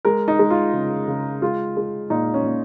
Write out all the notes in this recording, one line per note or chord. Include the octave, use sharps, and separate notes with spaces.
G#3 A#4
D#4
G#3
F4
C#3
C#3
G#3 F4
G#3
A#2 D#4
C#4
A#2